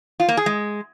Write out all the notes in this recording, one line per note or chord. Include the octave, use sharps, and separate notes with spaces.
F4
A#3
G#4
G#3